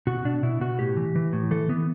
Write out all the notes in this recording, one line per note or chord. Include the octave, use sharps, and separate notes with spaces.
B2 F#4
B2 D4
B2 E4
B2 F#4
A2 G4
E3
E3
A2
E3 A4
E3 B3